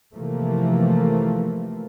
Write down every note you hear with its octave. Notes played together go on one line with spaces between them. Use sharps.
C3 E3 F3 A3 A#3